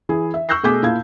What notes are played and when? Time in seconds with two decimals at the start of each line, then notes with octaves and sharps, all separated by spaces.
0.09 E3 E4 G#4
0.34 E5
0.49 C#6 E6 F#6 G6 A#6 C7
0.63 B2 A3 G#4 D6 G6 B6
0.83 A#2 E4 F5 A5 G#6